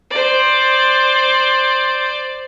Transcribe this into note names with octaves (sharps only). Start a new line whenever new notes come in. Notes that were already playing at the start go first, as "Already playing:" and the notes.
C5 D5